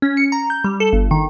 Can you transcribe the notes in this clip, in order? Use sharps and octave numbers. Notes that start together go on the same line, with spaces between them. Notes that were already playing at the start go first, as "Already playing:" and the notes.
C#4
C#7
A#5
G6
G3
A4
G1
D#3